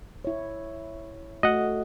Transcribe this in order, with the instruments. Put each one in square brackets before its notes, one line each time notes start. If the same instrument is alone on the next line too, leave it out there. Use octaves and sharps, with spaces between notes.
[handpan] E4 C#5
[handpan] A3 F#4 [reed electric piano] D#5 F#5